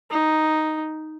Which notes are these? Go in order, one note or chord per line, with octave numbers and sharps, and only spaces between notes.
D#4